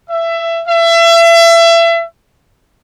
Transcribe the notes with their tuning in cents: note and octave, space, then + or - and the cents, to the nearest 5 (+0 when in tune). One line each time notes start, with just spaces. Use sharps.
E5 +20
E5 +30